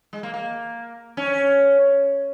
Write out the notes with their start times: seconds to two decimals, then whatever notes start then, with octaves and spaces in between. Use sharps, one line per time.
0.13 G#3
0.23 A#3
0.34 A#3
1.17 C#4